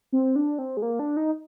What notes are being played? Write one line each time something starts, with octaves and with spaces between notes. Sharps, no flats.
C4
D4
C4
G#3
A#3
D4
D#4